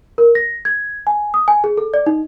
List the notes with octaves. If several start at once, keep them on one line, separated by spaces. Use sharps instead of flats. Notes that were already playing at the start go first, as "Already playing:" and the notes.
A#4
A#6
G#6
G#5
D#6
G#5
G#4
A4
D5
D#4